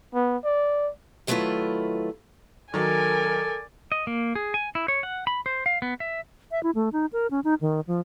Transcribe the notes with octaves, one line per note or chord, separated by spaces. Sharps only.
B3
D5
D#3 F#3 A3 E4 F4 B4
D#3 F#3 A4 A#4 D5 G#5
D#5
A#3
G#4
G#5
E4
C#5
F#5
B5
C5
F5
B3
E5
E5
E4
A3
D#4
A#4
C#4
D#4
D#3
F3